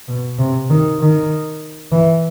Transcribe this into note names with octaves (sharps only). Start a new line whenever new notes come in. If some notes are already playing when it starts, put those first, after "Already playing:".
B2
C3
D#3
D#3
E3